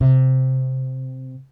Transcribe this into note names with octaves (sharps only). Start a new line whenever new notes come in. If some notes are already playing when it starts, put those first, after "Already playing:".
C3